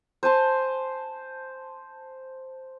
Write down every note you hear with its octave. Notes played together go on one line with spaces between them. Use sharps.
C5 G#5 A5 C6